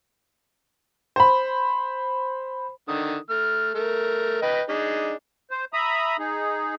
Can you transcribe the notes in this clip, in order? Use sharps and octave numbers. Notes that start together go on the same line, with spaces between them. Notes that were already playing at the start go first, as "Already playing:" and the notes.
C5 B5
D3 D#3 D#6
A3 F6
A3 A#4
B4 D#5 G5
D4 D#4 G#4
C5
E5 A#5 B5 D#6
D#4 G#4